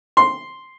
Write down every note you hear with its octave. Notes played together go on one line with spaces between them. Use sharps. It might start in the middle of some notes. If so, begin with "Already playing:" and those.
C6